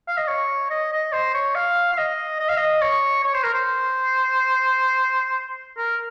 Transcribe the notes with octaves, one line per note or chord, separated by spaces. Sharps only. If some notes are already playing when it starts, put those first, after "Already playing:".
F5
D#5
C#5
D#5
D#5
C5
C#5
F5
F5
D#5
D#5
F5
D#5
C#5
C#5
C5
A#4
C5
A#4